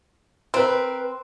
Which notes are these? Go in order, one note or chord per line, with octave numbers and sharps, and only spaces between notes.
C4 A#4 B4